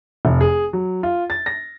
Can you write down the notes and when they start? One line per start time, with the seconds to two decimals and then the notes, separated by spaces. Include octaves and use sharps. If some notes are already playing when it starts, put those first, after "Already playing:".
0.25 F1
0.41 G#4
0.73 F#3
1.03 F4
1.30 A6
1.46 A#6